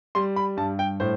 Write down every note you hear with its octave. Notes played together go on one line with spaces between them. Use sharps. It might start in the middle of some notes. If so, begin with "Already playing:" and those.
G3 C6
B5
G2 A5
G5
A2 C5